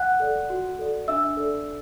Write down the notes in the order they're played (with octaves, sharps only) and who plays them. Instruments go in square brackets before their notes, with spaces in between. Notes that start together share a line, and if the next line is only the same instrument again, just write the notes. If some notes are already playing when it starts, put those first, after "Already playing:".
Already playing: [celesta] F#5 F#6
A4 D5
F#4
A4 D5
D4 E5 E6
A4 D5